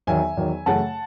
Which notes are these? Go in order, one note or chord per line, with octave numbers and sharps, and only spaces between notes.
E2 D#3 F#3 E5 G#5
E2 D#3 F#3
F#2 C#3 E3 A3 F#5 A5